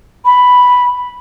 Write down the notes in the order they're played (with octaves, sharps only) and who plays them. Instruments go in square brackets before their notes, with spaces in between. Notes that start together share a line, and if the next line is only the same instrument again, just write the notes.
[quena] B5